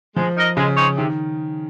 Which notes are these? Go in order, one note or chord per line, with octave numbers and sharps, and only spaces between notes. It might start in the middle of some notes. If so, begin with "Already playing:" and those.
F3 G#3
D#4 A#4 D#5
C#3 G#3
C4 D#4 G#4 C#5
C3 D#3